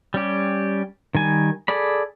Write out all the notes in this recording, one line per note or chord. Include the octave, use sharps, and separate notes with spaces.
G3 C#4 G4
D#3 G3 G#5
G#4 A4 D5 B5